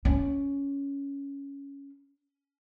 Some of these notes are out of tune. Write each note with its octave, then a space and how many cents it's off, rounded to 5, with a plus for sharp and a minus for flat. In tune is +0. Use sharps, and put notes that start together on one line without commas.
C#4 +10